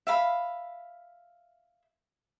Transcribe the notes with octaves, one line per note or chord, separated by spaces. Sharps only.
E5 F5 B5